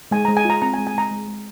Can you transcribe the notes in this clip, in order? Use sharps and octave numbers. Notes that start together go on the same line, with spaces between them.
G#3 G#5
G#3 A#5
G#5
F4 A#5
C4 A#5
G#5
G#3
G#5
G#3 A#5
G#3
G#3